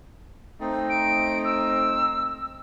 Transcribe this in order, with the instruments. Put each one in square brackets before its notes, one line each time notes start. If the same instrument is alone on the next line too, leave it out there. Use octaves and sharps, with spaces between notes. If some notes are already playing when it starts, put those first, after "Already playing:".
[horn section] A3 C4 D#4
[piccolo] D7
E6